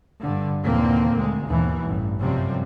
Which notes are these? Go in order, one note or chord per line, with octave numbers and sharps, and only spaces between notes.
G2 D3
D#2 A#2 D3 E3 A#3 C4
D2 G#3
D#2 G#2 B2 E3
A1 G2
F#2 C3 F3 G3 C4